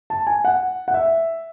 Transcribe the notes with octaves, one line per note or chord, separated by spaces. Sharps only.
A5
G#5
F#5
F#5
E5